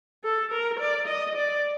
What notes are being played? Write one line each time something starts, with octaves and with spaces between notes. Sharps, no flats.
A4
A#4
D5
D#5
D5